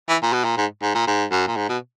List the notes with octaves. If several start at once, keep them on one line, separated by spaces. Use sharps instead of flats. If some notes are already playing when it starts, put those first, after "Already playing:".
E3
A#2
B2
A#2
G#2
G#2
A#2
G#2
F#2
A#2
G#2
B2